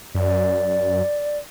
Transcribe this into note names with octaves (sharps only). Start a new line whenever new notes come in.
F#2 D5